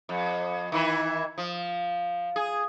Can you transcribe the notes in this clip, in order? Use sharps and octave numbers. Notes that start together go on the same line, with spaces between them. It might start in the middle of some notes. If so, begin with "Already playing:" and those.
F2
D#3 E3 E4
F3
G#4